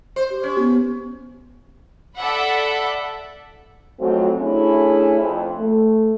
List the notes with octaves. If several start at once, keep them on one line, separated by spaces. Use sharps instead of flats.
C5
G4
C#4
B3
A4 D5 E5 F#5 B5
F2 G#2 F#3 A3 C4
A3 C#4 D4 E4 G#4
F2
A3